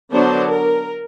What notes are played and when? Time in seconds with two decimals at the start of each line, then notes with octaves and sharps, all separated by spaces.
0.12 D3 F#3 B3 D4 C5
0.51 A#4